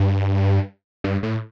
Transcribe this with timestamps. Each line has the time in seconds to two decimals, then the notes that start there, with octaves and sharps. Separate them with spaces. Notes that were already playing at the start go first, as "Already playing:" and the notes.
Already playing: G2
1.04 G2
1.23 A2